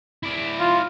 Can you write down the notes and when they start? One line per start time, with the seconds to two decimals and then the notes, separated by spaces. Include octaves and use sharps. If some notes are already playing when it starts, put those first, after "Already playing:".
0.23 E4 D5
0.60 F4